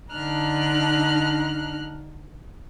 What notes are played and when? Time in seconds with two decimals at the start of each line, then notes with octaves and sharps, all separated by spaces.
0.12 D3 D4 D#4 A#5 F6 F#6